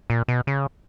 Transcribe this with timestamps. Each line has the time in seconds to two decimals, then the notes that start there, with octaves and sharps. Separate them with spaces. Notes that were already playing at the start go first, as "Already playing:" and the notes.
0.10 A#2
0.28 B2
0.47 C#3